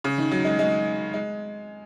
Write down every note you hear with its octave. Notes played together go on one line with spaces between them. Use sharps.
C#3
D#3
F#3
G#3
G#3
G#3